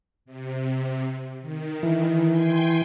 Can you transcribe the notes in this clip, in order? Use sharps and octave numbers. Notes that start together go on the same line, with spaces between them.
C3
D#3
E3
G5 G#5 C6